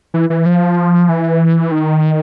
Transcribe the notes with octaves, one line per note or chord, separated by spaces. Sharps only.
E3
E3
F3
E3
D#3